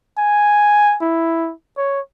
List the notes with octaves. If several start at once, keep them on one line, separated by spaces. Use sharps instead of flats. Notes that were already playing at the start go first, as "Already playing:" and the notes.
G#5
E4
C#5